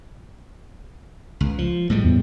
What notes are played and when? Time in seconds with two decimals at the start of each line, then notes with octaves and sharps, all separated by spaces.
1.41 C#2
1.58 F3
1.90 A2 G3 G#3
2.04 E2